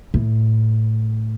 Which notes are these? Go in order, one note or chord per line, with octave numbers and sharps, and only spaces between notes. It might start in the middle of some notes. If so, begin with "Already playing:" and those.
A2